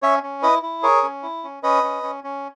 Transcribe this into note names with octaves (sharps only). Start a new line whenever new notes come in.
C#4 C#5 E5
C#4
E4 B4 D#5
E4
G#4 A#4 C#5
C#4
E4
C#4
C#4 B4 D#5
C#4
C#4
C#4